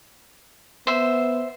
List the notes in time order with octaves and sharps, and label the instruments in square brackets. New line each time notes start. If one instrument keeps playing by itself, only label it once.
[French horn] B3 [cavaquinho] C5 E5